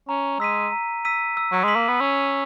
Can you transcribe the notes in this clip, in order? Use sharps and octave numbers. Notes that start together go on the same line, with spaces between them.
C#4 A#5
G#3 E6 B6 D#7
A#5
E6 B6 D#7
E6
F#3
G#3 B6 F#7
A#3
B3
C#4 E6